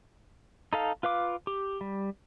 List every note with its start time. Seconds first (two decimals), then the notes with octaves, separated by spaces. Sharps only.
0.73 D#4 A4 F5
1.03 F4 B4 F5 D6
1.47 G4
1.81 G3